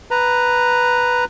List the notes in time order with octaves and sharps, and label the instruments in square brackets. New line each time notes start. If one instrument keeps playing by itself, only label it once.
[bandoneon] B4 A#5